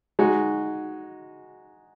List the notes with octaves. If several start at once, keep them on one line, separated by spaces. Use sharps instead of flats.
G#3 D#4 F#4